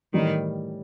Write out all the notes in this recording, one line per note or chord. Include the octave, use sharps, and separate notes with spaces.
A2 D#3 E3 G3